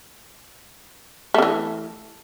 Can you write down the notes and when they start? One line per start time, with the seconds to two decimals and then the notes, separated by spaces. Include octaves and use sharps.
1.34 A3
1.38 C#3
1.42 E3